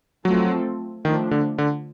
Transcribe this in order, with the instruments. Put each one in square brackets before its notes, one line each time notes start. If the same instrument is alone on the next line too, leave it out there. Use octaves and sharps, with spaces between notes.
[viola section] F3 A3 C4 F4 A4 [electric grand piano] F#3
[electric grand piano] D#3 [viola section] F3 A3 D4
[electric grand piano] D3
D3